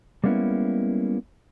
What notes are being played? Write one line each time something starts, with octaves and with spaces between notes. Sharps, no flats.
G3 G#3 A#3 B3 C#4 E4